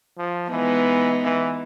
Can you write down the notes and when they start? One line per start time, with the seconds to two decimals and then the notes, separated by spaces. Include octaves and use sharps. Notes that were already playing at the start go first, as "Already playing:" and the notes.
0.18 F3
0.51 E3 G#3 B3 D#4
1.24 E3